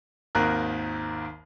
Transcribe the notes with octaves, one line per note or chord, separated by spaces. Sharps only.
G#1 D#2 D#3 A#4 F#6